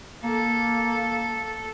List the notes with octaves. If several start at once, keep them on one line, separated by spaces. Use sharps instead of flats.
A#3 A4